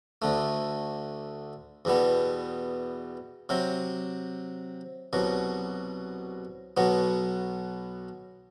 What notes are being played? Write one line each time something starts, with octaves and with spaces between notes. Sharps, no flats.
D2 D3 A3
E2 B2 G3 B3
C3 F#3 C4
C2 B2 F#3
B1 B2 F#3 B3